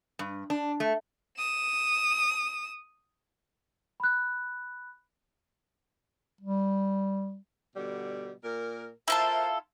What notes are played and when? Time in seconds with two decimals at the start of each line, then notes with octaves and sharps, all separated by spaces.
0.19 G2
0.50 D4
0.80 A3
1.38 D#6 E7
4.00 B5 F#6
6.41 G3
7.76 B2 D3 G3
8.44 A#2 A#4
9.08 E4 F4 A4 A#4 C5 E5